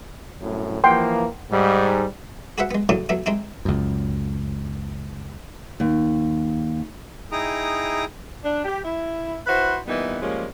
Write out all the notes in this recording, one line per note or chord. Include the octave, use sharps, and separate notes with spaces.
C2 F#2 A2
E3 F3 A#3 F#5 G5 C6
G#2 G3
F#4 G#4 B4 C5 E5 F#5
G#3 B3
C2 A2 C#3 F#3 A3 D#6
F#3 A3 B3 E4
G#3 C4 D#4 E4
C#2 F#2
D#2
D#4 E4 G#4 G5 A#5 D#6
D4
G4
E4
E4 F#4 B4 C5
A#2 E3 G3 B3 D#4
F3 G3 G#3 A#3 C#4